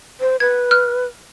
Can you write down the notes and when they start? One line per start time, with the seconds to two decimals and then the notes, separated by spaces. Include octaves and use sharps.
0.21 C5
0.40 B4 G#6
0.71 F6 F#6